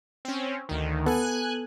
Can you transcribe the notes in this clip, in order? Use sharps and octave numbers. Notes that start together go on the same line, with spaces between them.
C4 C#4
D2 D#3
B3 A4 G#5 F#6